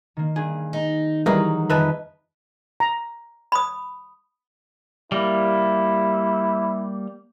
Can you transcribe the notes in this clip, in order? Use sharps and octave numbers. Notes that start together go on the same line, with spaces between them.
D#3 A#3
G2 G#4
D#4
E3 F#3 G3 D#4 G#4 A#4
F2 D#3 D#4 B4 E5 A5
A#5
B5 D#6
G3 A#3 E4